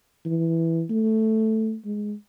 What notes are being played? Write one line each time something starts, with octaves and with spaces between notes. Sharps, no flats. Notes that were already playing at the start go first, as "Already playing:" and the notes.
E3
A3
G#3